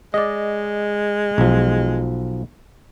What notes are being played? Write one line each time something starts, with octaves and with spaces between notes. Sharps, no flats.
G#3 D5 D#5
B1 F3